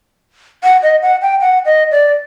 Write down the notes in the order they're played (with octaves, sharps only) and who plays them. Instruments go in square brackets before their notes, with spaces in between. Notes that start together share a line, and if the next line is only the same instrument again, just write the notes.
[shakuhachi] F#5
D#5
F#5
G5
F#5
D#5
D5